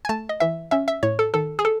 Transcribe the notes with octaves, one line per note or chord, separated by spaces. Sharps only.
G#5
A3 A5
D#5
E3 E5
C#4 E5
E5
A2 C#5
A4
D#3 A4
G#4
A4